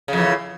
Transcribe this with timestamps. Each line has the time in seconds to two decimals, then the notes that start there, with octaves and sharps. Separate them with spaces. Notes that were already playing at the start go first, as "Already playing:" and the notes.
0.08 C#3
0.13 F2
0.18 E3